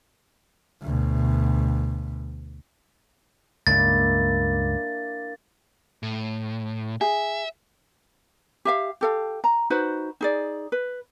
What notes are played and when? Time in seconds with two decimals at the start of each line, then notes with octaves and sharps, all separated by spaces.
0.82 D2 B2
3.67 C#2 G2 A#3 D4 E4 A6
6.03 A2
7.01 G#4 E5
8.65 G4 E5 F5
9.01 G4 A4 F5
9.44 A#5
9.70 D#4 F#4 B4 C5
10.21 D#4 G#4 D5
10.72 B4